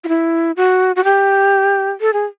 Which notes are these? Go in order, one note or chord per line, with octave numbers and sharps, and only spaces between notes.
F4
E4
F#4
F#4
G4
A4
G#4